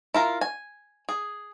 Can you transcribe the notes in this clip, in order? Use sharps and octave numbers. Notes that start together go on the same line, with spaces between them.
E4 F4 A#4
G#5
G#4